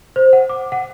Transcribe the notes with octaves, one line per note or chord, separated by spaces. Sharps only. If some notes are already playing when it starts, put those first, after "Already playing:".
C5
F#5
D6
F#5